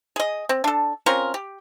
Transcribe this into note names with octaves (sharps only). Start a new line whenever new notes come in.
G#4 D#5
C4
D4 A4
C4 C#4 F4 A#4
G4